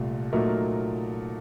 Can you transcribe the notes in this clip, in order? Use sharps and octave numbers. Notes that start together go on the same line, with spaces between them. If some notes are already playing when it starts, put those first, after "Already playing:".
Already playing: C2 A#2 A3
A#2 F#3 A3 D#4 A#4